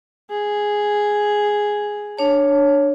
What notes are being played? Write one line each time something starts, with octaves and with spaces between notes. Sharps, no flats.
G#4
D4 C#5 A5